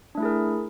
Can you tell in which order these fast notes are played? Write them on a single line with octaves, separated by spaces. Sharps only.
D4 A3 E4 G#4 A#4